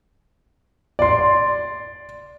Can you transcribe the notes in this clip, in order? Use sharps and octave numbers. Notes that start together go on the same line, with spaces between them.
D5 C6